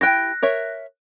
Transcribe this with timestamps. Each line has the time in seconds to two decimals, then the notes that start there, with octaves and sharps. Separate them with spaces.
0.01 E4 G4 G5 F#6 A#6
0.42 A#4 C#5 E5